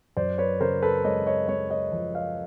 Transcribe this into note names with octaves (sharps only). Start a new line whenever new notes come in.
F#2 C5 D5
B4 C#5
C#3 A#4 C5
A4 B4
G#3 C#5 D#5
C#5 D#5
G#3 C#5 D#5
C#5 D#5
F3
D#5 F5